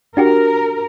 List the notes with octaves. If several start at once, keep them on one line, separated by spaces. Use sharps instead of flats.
D4 F#4 G4 A#4